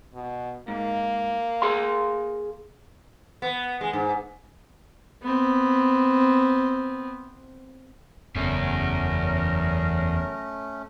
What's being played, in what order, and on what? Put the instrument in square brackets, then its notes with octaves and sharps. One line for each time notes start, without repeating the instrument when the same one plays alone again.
[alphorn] B2
[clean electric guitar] G#2 [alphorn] A#3
[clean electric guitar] G#4 F5 C6
[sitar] B3
G#3
G#2
[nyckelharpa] B3 C4
[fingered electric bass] F#1 C#3 [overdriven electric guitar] E2 [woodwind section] F#3 A#4 [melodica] A3 C#4